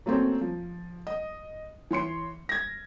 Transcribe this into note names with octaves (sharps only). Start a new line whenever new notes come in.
F#3 A3 A#3 C4 C#4
F3
D#5
E3 C#5 C6 C#7
G#6 A#6